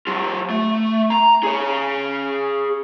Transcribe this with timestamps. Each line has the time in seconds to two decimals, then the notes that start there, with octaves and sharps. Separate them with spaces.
0.07 F#3 F4
0.50 A3
1.10 A#5
1.43 G#4 C#5